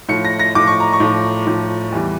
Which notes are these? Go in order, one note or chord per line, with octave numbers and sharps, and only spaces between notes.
A2 F3 C#7
A#6
A#6
A2 F3 D6
C#6
A#5
C#6
A2 F3
A2 F3
E2 E3 G3